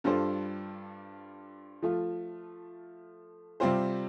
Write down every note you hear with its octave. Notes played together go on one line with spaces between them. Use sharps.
G2 G3 F4 A4 C5
F3 A3 F4
C3 G3 C4 F4 C5